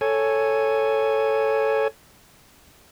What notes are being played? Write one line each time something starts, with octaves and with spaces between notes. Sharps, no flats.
A4 C#5 G#5